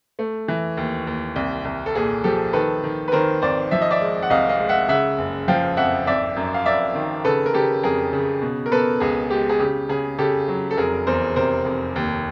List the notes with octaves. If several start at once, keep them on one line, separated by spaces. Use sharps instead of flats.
A3
E3
D#2
D#2
C2
C2
A4
A#2 G#4
F3 G4 A4
D#3 A4 B4
D#3
B4
D#3 A#4 C5
G#1 C5 D5
F3 E5
D#5
D5 E5
G#3
F#5
C2 D#5 F5
D#5 F5
G#3
E5 F#5
C#3 E5 F#5
F#1
F3 F5 G5
F2 E5 F#5
G#1 D5 E5
F#2
F5
F#2 D5 E5
D#3
C#3 A4 B4
A#4
C#3 G4 A4
F2 G#4 A#4
C#3
B2
A#4
B2 A4 B4
C#2 G#4
G#3 G4
G#4
C#3 G4
C#3 G#4
C#3 G4 A4
F#3
A4
F1 G#4 A#4
E2 A#4 C5
C3 A#4 C5
F1
D#2